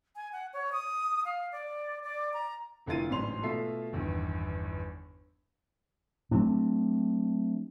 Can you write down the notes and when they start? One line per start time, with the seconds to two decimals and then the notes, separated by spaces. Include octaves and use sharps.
0.16 G#5
0.32 F#5
0.53 C#5
0.72 D#6
1.25 F5
1.52 D5
2.03 D5
2.34 A#5
2.86 F1 D3 E4 F4 A6 D#7
3.10 A1 G#2 F#3 D4 C6 F7
3.42 B2 A3 F4 E5 C7
3.93 G1 E2 D#3
6.31 F#3 A3 C4 D4